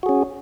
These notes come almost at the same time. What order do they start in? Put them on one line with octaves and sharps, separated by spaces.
F#4 G#4 C#4